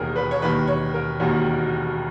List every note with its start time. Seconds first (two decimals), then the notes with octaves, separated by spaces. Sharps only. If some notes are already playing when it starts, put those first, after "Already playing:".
Already playing: E1 D#2 D#3 G#4 A#4
0.16 B4
0.31 C#5
0.41 E1 D#2 D#3 B4
0.67 C#5
0.94 A#4
1.20 E1 D#2 D#3 F#4